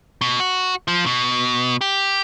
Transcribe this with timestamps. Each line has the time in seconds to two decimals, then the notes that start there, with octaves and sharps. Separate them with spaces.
0.21 B2
0.40 F#4
0.88 F3
1.06 B2
1.81 G4